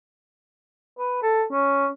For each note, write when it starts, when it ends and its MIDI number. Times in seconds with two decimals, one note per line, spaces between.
0.99 1.18 71
1.23 1.44 69
1.52 1.88 61